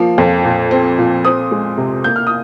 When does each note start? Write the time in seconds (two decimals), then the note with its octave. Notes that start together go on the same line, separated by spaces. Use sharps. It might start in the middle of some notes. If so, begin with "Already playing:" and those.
Already playing: F3 A#3
0.18 F2
0.44 A#2
0.71 C4
0.98 A#2
1.25 C4 D#6
1.51 G#3
1.78 C3
2.04 A#3 G6
2.16 F6
2.27 D#6